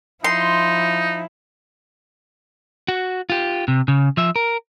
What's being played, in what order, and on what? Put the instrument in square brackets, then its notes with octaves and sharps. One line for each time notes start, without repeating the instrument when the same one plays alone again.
[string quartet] F3 E4 [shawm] D#4 [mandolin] C6
[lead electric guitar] F#4
F4 G4
C3
C#3
F3 E5
A#4